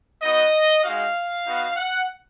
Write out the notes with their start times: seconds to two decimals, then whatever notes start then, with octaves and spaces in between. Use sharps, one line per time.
0.21 B3 D#4 F#4 D#5
0.83 G#3 D#4 F#4 F5
1.45 B3 D#4 F#4
1.77 F#5